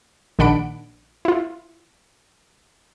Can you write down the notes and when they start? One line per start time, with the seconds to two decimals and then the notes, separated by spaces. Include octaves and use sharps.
0.39 A#1 D#3 D4 F#5 B5 D7
1.25 E4 F4